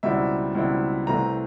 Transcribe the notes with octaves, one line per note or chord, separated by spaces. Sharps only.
C#2 B2 G3 C4 E4 E5
C#2 B2 G3 C4 E4
C2 C3 E3 A3 C4 A#5